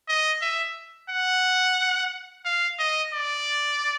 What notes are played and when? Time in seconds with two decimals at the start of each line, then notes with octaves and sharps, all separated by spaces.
0.08 D#5
0.41 E5
1.10 F#5
2.45 F5
2.79 D#5
3.13 D5